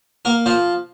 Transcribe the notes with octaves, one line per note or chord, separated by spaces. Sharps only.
A#3 A#4
F3 C5